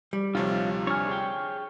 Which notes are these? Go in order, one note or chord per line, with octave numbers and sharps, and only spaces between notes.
G3
D2 C3 F3 D#4 F4 C#5
D4 C#5 G#5 F6
G#4 G5